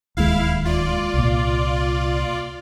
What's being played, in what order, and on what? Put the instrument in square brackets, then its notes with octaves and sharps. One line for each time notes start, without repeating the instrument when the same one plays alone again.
[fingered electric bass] D1 D#2 G#3 [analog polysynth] E4 F5
[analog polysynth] F4 D5
[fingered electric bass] C2 A#2